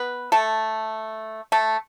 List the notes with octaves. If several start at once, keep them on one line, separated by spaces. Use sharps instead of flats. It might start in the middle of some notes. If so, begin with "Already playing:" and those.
Already playing: B3 B4
A3 A4
A3 A4